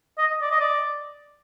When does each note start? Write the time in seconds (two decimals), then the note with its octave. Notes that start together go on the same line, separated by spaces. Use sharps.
0.18 D#5
0.42 D5
0.51 D#5
0.60 D5